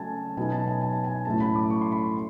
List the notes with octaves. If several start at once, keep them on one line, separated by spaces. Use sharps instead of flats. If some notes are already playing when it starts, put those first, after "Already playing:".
Already playing: C#3 F#3 A3 G#5 A5
B2 F#3 B3 D#4 G#5
A5
G#5
G#5
A5
G#5
A2 F#3 A3 C#4 A5
B5
D6
C#6
C6
B5
C6